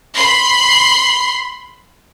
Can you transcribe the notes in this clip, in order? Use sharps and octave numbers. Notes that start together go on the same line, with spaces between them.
B5 C6 C7